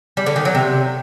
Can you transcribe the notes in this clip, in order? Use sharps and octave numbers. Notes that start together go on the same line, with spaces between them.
G3
D3
D#3
F#3
C3